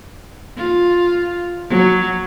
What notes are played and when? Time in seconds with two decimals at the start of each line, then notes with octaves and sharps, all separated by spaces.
0.57 F4
1.70 F#3